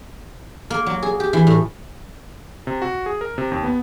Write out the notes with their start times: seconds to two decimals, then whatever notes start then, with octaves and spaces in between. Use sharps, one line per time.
0.70 A#3
0.86 F#3
1.03 G#4
1.20 G4
1.33 E3
1.47 A2
2.67 C3
2.82 F#4
3.06 G#4
3.21 A#4
3.38 C3
3.52 D#2
3.64 B3